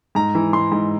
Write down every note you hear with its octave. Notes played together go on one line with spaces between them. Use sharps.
G#2 A#5
E3
G#2 C6
G#2